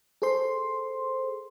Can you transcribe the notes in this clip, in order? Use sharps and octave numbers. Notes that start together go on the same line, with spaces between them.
G#4 A4 C5 C6